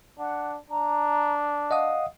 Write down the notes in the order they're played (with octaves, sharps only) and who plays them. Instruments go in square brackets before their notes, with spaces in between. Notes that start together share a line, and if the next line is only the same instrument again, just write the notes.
[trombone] D4 [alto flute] F#5
[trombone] D4 [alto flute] A#5
[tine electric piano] D#5 F#5 D#6 [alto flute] F5